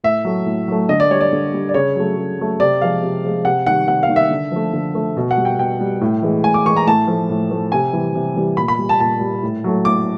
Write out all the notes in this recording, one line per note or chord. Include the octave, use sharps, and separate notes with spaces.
A2 E5
F#3 A3
A2
F#3 A3
D3 D#5
D5
G3 C#5
D5
D3
G3
D5
C#3 C#5
F#3 A3
C#3
F#3 A3
C3 D5
F3 G#3 F5
C3
F3 G#3
C3 F#5
D#3 G3 F#5
C3 F#5
F5
D#3 G3
E5
D3
F3 A3
D3
F3 A3
B2
F#5
G3
G5
B2 G5
G3
A2
E3 G#3
A2 G#5
D6
E3 G#3 C#6
A#5
A2 A5
F3 A3
A2
F3 A3
C3 G#5
E3 G3
C3
E3 G3
A#2 B5
B5
G3
A5
A#2 A5
G3
A2
F#3 A3
A2 D6